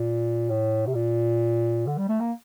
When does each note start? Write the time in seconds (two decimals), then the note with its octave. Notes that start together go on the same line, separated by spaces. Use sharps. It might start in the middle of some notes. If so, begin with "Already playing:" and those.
Already playing: A#2
0.49 A2
0.87 C3
0.95 A#2
1.87 D3
1.98 G3
2.09 A3
2.20 A#3